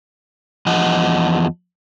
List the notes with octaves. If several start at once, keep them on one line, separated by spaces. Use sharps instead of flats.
E2 F3 D#5 F#5